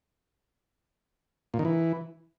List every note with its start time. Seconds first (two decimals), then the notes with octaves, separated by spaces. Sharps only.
1.54 A#2
1.59 D#3
1.65 E3